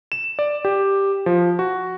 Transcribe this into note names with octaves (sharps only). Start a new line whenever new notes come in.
E7
D5
G4
F3
F#4